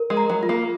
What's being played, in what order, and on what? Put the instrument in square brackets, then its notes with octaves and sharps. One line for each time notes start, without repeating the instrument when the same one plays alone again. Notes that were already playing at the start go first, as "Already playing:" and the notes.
Already playing: [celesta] A#4
[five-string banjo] G#3
[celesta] A#5
[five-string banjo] F#3
[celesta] F4
[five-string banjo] A#3